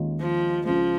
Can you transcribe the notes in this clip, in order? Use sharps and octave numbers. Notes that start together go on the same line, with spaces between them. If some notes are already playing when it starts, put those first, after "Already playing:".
Already playing: D#2 D#3 G#3 C#4 F4
F3
C#2 C#3 F3 G#3